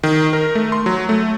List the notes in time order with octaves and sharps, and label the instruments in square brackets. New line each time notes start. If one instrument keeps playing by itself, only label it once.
[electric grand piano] D#3
A#4
A3
C6
F#3
A3